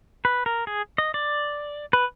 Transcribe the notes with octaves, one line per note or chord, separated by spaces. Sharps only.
B4
A#4
G#4
D#5
D5
B4